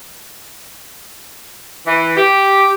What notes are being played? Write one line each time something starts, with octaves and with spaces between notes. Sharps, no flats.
E3
G4